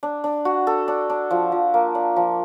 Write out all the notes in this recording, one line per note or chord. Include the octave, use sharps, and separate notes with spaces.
D4
D4
F#4
A4
D4
D4
F3
F3
A#3
D4
F3